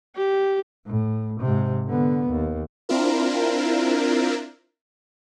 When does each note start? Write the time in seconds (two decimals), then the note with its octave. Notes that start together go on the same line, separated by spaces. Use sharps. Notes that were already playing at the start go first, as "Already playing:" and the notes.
0.16 G4
0.86 A2
1.41 G#2 C3
1.87 D3 B3
2.29 D#2
2.89 C4 D4 E4 F4 A#4